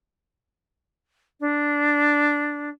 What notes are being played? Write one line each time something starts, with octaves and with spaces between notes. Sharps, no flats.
D4